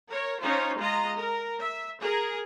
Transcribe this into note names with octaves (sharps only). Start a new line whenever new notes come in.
A#4 C#5
C#4 D#4 F4 C5
G#3 F4 D#5 A#5
A#4
E5
G#4 A#4